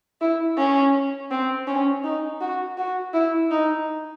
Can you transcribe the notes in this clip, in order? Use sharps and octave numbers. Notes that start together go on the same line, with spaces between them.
E4
C#4
C4
C#4
D#4
F#4
F#4
E4
D#4